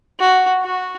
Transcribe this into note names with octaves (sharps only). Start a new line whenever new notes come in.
F#4
F#4